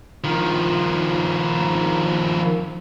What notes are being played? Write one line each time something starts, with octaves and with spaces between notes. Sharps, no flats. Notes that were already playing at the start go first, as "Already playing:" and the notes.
D#3 F3